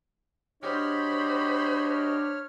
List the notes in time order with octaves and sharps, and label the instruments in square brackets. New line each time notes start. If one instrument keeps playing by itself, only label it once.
[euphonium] D4 [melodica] F#4 G4 D#5 [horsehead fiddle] C5 B5 [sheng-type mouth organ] C#5 F6